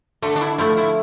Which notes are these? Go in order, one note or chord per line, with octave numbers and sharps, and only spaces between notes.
D3 A3
D4
E4
F3 A3 E4
E4